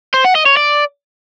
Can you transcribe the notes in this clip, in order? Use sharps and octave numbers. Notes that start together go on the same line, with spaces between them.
C5
F#5
D#5
C#5
D5